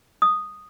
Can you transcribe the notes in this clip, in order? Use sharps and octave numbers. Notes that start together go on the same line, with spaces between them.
D#6